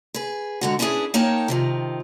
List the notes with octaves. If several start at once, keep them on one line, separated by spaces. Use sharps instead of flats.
G#4 B4
G#2 D3 F#4
C#4 D4 E4 F#4 G#4 B4
A#3 D#4 A#4 C#5 G5 A5
C3 D#3 F3